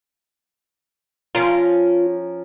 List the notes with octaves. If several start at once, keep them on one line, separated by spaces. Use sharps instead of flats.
F3 C#4 F4 A#4